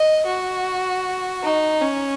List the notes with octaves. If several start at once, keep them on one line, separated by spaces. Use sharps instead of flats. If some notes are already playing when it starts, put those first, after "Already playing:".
Already playing: D#5
F#4
D#4
C#4